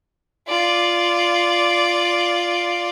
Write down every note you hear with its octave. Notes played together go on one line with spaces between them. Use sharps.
F4 D5